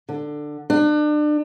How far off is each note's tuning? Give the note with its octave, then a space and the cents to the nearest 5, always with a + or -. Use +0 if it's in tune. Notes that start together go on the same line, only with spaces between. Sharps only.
D3 +15
D4 +35